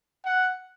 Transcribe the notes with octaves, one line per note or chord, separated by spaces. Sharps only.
F#5